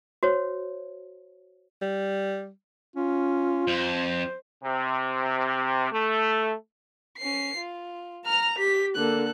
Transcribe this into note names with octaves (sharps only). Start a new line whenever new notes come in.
F#4 C5 C#5
G3
C#4 F4
F2 C5
C3
A3
C#4 C7
F4
A#5 F6 F7
G4 B6
D3 A#3 A4 F#6